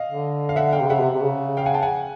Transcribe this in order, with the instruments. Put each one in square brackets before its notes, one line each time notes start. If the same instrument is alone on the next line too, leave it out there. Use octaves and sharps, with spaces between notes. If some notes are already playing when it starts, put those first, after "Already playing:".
Already playing: [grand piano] D#5 F5
[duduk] D3
[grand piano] F5
E5 F#5
F5 G5
[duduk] C3
[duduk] C#3 [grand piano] E5 F#5
[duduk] C3
C3
C#3
[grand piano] F5 G5
F#5 G#5
G5 A5
F#5 G#5